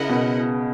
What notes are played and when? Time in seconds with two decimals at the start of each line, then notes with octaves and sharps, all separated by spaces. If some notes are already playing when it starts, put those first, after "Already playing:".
Already playing: C#3 E4 A#4 D#5 F#5
0.09 B2